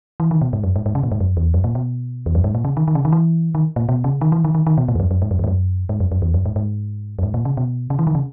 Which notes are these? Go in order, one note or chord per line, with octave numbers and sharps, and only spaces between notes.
E3
D#3
B2
G#2
F#2
G#2
G#2
C#3
A#2
G#2
F#2
E2
F#2
A#2
B2
E2
F#2
G#2
A#2
C#3
D#3
D#3
C#3
D#3
E3
D#3
A#2
B2
C#3
D#3
E3
D#3
D#3
D#3
B2
A#2
E2
F#2
F#2
G#2
F#2
E2
G#2
F#2
G#2
F#2
F#2
E2
F#2
G#2
G#2
F#2
G#2
A#2
C#3
B2
C#3
E3
D#3
C#3